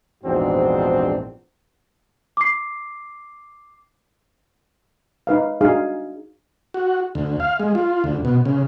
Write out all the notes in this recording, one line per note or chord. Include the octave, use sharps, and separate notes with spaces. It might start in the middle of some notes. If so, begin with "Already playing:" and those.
A#1 E2 G#2 C4 D4 F#4
D6 C7
D#4 B4 F5
D4 D#4 F#4 G#4 F5
F#4
D2
F5
G#3
F4
D2
B2
C#3